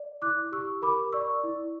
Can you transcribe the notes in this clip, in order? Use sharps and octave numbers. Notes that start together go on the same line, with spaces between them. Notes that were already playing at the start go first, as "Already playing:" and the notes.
Already playing: D5
E4 D6 F#6
G4 C#6 E6
A#4 B5 D6
D5 C#6 E6
E4